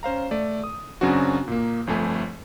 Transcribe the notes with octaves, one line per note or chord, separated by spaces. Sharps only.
C#4 C5 F5 A#5
A3 D5
D#6
F#2 C#3 F#3 C4 D4 F#4
A#2 A#3
G1 F2 A3 G#5